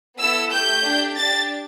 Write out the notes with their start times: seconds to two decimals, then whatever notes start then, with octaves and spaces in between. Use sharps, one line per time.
0.17 B3 E4 A4 E6
0.50 A3 G4 G6
0.84 D4 G4
1.17 D4 G4 A6